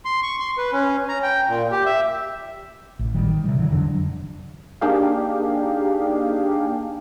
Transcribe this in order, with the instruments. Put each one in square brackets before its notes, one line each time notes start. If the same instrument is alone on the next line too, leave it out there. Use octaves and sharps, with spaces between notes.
[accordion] C6
C#6
C6
B4
C#4
A#5
G5
A#2
G4
E5
[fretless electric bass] A1
D#3 G3
C3 E3 G3
D3 E3 F#3
F2 D3 F#3 D4
[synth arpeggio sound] A#3 D4 D#4 G4 G#4 F5